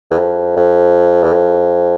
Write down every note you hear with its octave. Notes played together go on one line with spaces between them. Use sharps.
E2
F2
F2
E2
F2